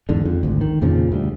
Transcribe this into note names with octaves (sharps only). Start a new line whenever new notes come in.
E2 G#2 D3
F2
G#1 D2
D#3
F2 A#2 C#3 F3
D2 G3